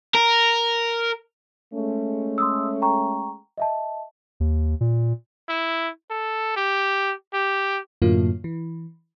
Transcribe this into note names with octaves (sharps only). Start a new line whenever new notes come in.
A#4
G#3 A3 C#4
C6 D#6 E6
G5 A#5 C#6
D#5 E5 A5
D#2
A#2
E4
A4
G4
G4
F#2 A2 D3 F#3 A#3 F4
E3